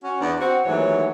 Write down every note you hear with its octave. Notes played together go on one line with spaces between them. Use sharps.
C#4 F#4
E2 B3 D4
C4 F#4
D#2 G#2 E3 F#3 A3 C#5